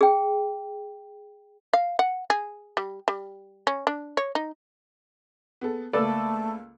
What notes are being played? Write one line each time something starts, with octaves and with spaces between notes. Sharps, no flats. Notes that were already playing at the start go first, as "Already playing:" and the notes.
G#4 G5
F5
F#5
G#4
G3
G3
C#4
D4
C#5
D#4
B3 G#4 A4
C#2 A3 A#3 A4 B4 D5 E6